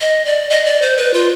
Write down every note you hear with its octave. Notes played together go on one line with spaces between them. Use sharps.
D#5
D5
D#5
D5
C5
B4
F4